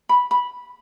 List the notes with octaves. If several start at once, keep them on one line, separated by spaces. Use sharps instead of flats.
B5
B5